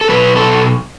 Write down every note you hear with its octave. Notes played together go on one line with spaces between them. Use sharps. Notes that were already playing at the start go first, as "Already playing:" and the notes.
A4
B2 F#3 B4
A4